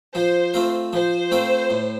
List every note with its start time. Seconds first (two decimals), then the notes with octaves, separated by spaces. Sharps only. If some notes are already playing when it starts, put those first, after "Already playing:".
0.14 F3 C5
0.54 A3 C4 F4 A#4
0.93 F3 C5
1.31 A3 C4 F4 A#4
1.70 A2